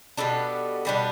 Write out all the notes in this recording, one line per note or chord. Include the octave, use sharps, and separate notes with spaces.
B2 G3 B3 D4 A4
B2 G3 B3 D4